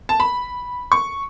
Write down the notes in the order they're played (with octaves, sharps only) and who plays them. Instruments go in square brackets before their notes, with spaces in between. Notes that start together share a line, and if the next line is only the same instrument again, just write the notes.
[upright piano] A5
B5
C#6